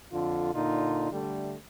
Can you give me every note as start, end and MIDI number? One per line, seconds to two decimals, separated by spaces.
0.12 0.49 41
0.12 0.49 50
0.12 0.49 65
0.52 1.10 46
0.52 1.10 50
0.52 1.10 63
0.52 1.10 65
1.12 1.54 50
1.12 1.54 55
1.12 1.54 57